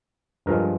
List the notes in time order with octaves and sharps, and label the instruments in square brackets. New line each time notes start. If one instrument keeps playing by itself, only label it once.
[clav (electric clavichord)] G2 F3 G#3 A#4